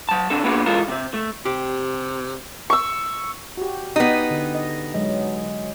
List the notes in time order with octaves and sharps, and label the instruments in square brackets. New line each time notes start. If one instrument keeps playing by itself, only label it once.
[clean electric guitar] F#3 A5
C3 D4 A4
A#3 B3 D4 F#4 G#4
E3 G#3 F4 A4 A#4
C3 C4
A3
[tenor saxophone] C3 [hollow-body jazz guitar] G4
[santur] C#6 E6
[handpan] F#4 G4
[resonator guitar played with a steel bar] B3 D#4 [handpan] G4
[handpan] D3
D#5
F#3 G#3